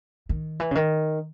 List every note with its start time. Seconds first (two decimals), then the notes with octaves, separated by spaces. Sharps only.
0.29 D#3
0.60 E3
0.71 C#3
0.75 D#3